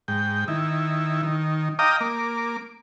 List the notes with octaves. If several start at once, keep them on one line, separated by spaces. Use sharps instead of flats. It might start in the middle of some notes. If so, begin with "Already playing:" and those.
G#2 G5
D#3 E4
D#3
D#5 F5 G5 A#5 D6 D#6
A#3 D6